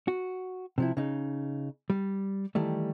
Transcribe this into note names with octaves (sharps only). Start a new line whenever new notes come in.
F#4
C3 F3 E4
C#3 D#4
G3
D#3 E3 G3 A3